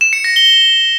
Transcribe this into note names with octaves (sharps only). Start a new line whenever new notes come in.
E7
C#7
A#6
G7